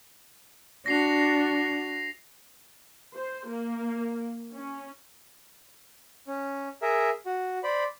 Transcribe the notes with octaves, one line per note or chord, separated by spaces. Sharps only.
D4 F#4 A#6 C7 F7
C5
A#3
C#4
C#4
G#4 A#4 E5
F#4
C5 D5 B5